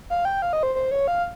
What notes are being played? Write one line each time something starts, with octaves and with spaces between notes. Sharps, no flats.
F5
G5
F5
D#5
C5
C5
C#5
F5